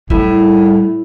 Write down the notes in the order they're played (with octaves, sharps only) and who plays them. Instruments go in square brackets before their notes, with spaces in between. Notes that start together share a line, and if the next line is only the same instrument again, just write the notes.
[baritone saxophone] A2 [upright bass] G3 [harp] E4